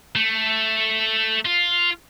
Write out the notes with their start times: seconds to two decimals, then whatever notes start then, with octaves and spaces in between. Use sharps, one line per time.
0.16 A3
1.45 F4